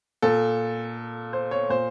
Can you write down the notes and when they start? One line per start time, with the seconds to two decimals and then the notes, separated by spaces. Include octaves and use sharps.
0.22 A#2 A4
1.33 C5
1.51 C#5
1.70 A#2 C5